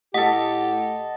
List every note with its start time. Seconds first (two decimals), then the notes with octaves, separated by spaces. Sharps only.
0.14 A2 G4 A4 D#5 F#5